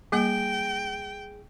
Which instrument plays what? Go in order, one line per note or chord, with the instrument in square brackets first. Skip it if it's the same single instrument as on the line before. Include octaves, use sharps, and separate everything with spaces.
[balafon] G3 A#3 [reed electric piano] G#4 [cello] G5